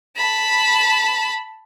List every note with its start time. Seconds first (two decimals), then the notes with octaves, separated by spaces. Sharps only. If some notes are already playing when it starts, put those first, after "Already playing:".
0.17 A5 B5